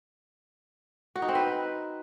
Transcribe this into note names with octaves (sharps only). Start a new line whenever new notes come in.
F#4
D#4
C4
B4